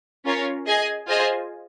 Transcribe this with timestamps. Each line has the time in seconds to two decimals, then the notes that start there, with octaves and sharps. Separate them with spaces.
0.25 C#4 F4 A#4 C#5
0.66 G#4 D#5 G#5
1.07 F4 G#4 C5 D#5 G#5